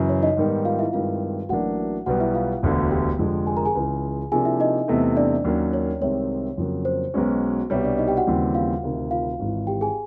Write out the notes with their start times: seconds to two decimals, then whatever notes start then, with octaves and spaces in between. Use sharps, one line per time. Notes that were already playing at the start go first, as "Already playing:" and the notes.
Already playing: F#2 C#3 E3
0.09 C#5
0.22 D#4 D#5
0.37 G#2 D#3 G3 B3
0.65 F4 F5
0.79 E4 E5
0.93 G2 D#3 G#3 C4 E4 F4 F5
1.49 A1 A2 F#3 A#3 D4 F#4 F#5
2.06 B1 B2 G3 B3 F#4 F#5
2.20 E4 E5
2.34 F4 F5
2.63 E1 D2 D3
2.91 G4 G5
3.19 F1 F2 D3 F3 G#3
3.47 G#4 G#5
3.57 A#4 A#5
3.65 G#4 G#5
3.75 C#2 C#3 E3
4.32 C3 F3 A#3 D4 G#4 G#5
4.45 E4 E5
4.60 D#4 D#5
4.88 E2 C3 E3 A3
5.16 D4 D5
5.44 D#2 D#3 F#3 A#3 C#4
5.73 C#5
6.00 C2 C3 D#3 G#3 C4 C#5
6.58 F2 C#3 F#3 A#3
6.85 C5
7.14 B1 B2 G#3 C#4 F#4
7.70 C2 B2 G3 C#5
7.84 D4 D5
7.98 D#4 D#5
8.07 G4 G5
8.17 F#4 F#5
8.27 D#2 C#3 E3 G3 C4
8.54 F4 F5
8.83 D2 C3 D#3
9.11 F4 F5
9.40 G#1 G#2 E3
9.67 G4 G5
9.81 G#4 G#5